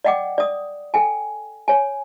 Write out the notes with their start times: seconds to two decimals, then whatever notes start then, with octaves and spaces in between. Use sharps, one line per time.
0.04 D5 D#5 F#5 G5 D6
0.38 D5 D#6
0.94 A4 G5 G#5
1.68 C#5 G#5